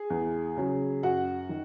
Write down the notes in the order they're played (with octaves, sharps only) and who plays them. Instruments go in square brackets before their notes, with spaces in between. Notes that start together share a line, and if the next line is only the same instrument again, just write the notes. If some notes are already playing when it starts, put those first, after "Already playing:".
Already playing: [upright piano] G#4
E2
C#3 F#3
F#2 F#4 F#5
D#3